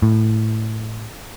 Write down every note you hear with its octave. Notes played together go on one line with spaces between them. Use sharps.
A2